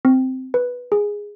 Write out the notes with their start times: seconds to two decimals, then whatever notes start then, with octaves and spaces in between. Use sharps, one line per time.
0.05 C4
0.54 B4
0.92 G#4